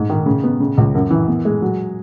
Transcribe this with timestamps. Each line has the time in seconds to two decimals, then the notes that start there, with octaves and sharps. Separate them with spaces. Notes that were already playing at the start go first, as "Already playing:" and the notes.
Already playing: G#2
0.10 D#3
0.26 C#3
0.44 B3
0.60 C#3
0.77 C#2
0.95 F#2
1.10 E3
1.28 B3
1.45 G#3
1.62 F#3